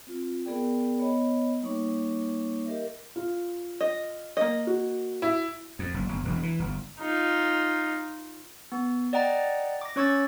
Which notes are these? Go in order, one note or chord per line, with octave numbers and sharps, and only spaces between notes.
C4 F4
B3 G#4 A#4 D5 G5
B3 C#5 D#5 B5
G3 A#3 D#4 C#5 C#6 D6
G4 A#4 D#5 E5
F4
D#5
A#3 D#5
F#4
E4
F2
F#1
G1
E1
E3
G1
D#4 F4
B3
D5 D#5 F#5 G5 A#5
D6 A#6
C#4 C#5 C#6 E6 G#6 A6